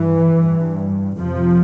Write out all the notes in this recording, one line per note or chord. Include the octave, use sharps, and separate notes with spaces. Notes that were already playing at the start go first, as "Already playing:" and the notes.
Already playing: G2 E3
G2
F2 C3 F3